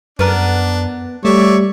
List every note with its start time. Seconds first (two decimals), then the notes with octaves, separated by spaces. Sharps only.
0.19 F#2 B3 D4 A#4
1.25 G3 A3 C#5 D5 E5